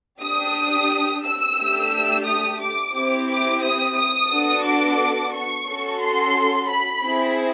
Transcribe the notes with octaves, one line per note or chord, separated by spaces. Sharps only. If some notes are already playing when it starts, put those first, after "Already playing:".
D4 G4 D#6
E6
A3 D4 G4
D#6
D6
C4 E4 G4
D6
D#6
D#6
B3 D4 F#4 A4
D6
C#6
C#4 F#4 A4
C6
B5
C4 E4 G#4